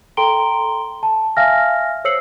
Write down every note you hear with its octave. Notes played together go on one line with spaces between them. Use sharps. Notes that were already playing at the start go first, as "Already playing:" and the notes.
A4 G5 A#5 C6 D7 G7
A5
E5 F5 G#5 F6 A#6
C5 C#5 E6 C7 C#7 F#7